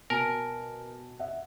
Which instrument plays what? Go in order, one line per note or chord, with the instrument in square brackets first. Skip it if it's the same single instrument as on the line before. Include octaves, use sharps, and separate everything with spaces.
[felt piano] B2 [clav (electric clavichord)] A#4 [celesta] G#5 A5
[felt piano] E5 F#5